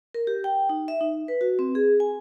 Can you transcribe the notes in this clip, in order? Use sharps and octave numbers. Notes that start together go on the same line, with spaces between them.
A#4
G4
G5
D#4
E5
D#4
B4
F#4
C4
G#4
G#5